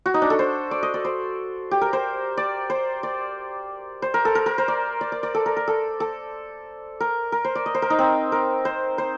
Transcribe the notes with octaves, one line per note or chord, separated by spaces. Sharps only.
F#4
D#4
D4
A4
C5
D5
D#5
D5
C5
G4
A#4
C5
D5
C5
D5
C5
A#4
A4
A#4
A#4
C5
D5
D5
D5
D5
A4
A#4
A#4
A4
A4
A#4
A#4
C5
D5
D#5
C5
A#4
D#4
C4
A#4
C5
C5